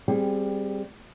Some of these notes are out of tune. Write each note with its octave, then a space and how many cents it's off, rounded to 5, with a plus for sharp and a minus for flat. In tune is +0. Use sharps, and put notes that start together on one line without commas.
G3 +10 C4 +0 G#4 +0